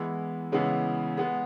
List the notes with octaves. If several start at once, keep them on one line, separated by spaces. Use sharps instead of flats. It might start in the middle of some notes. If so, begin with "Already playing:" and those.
Already playing: E3 G#3 B3 E4
C#3 E3 G#3 B3 E4
G#3 B3 G#4